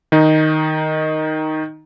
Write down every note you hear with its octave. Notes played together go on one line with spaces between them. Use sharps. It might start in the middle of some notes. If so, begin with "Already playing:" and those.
D#3 D#4